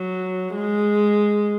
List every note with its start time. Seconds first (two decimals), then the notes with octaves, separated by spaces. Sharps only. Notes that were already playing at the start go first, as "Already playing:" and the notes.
Already playing: F#3
0.55 G#3